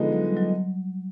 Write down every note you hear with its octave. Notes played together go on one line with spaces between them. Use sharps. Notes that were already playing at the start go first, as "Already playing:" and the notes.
Already playing: D3 F3 G#3 B3 D#4
F#3
G3
F#3